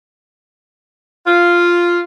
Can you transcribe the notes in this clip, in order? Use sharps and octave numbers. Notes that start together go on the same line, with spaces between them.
F4